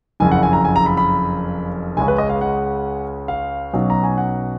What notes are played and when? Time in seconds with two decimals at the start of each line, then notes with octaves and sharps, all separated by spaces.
0.20 F#1 F2 C#3 G#5
0.31 F#5
0.43 G#5
0.53 A#5
0.65 G#5
0.76 A#5
0.86 B5
0.97 B5
1.97 C#2 C#3 G#3 C#4 G#5
2.08 B4
2.18 D#5
2.30 F5
2.41 F#5
3.28 F5
3.73 B1 B2 F#3 C#4
3.90 A#5
4.04 G#5
4.18 F#5